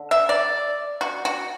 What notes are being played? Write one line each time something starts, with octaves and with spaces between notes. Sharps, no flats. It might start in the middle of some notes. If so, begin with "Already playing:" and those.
Already playing: D3
E5
D5
F#4
F#4